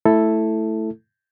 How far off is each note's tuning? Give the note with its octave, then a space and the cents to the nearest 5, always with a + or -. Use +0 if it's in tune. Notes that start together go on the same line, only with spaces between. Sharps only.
A3 +0 E4 +0 A4 +0